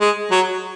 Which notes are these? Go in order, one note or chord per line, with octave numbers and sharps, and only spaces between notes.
G#3
F#3